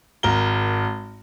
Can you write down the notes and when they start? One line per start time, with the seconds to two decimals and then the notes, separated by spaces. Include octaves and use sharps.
0.23 G#1 A#4 G7